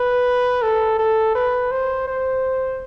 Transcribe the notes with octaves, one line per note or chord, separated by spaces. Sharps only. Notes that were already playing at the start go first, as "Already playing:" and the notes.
Already playing: B4
A4
A4
B4
C5
C5